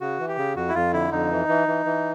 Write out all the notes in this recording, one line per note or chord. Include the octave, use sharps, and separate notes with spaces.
C#3 F#4
E3
G4
C#3
F2 F#4
E4
F2 F4
D3 E4
F2 D#4
E3
E3
E3
E3